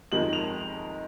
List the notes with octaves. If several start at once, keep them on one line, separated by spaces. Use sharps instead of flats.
F2 D#3 G#3 F#7
F7